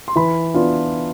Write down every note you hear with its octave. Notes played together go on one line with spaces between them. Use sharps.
C6
E3 B5
B3 D4 F4